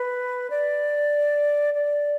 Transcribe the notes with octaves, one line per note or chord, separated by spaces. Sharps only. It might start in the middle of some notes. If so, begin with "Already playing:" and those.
Already playing: B4
D5
D5